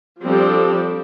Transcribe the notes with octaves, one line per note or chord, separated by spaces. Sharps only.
F3 G3 C4 D4 G4 A4